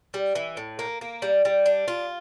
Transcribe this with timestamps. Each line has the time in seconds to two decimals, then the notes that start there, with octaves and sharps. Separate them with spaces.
0.14 G3
0.35 E3
0.57 A2
0.79 A#3
1.01 A#3
1.22 G3
1.45 G3
1.66 D4
1.88 F4